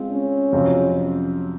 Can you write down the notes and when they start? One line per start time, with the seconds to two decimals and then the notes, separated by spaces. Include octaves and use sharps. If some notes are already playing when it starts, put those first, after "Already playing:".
Already playing: G#3 C4 F4
0.12 C#4
0.52 F2 C3 F#3 C4